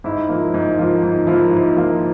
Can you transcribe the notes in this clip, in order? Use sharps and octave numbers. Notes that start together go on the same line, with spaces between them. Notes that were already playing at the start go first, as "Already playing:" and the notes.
G#2 E4
F3 A#3
G#2
F3 A#3
G#2
F3 E4
A#3
G#2
F3 A#3